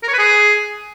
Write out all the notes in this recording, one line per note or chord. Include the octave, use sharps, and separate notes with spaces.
A#4
C#5
B4
G#4